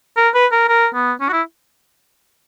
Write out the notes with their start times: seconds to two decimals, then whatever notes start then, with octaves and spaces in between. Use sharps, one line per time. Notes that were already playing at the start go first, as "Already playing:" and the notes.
0.17 A#4
0.34 B4
0.52 A#4
0.69 A#4
0.94 B3
1.20 C#4
1.29 F#4
1.33 E4